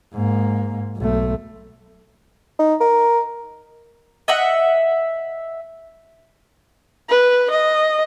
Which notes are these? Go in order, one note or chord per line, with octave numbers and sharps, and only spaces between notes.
G#2 A#3
B1 A3
D#4
A#4
D#5 E5 F#5
B4
D#5